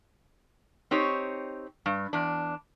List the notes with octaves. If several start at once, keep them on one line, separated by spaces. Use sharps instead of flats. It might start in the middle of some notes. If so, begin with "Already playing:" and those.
C4 D#4 G4 C#5
G2
E2 D4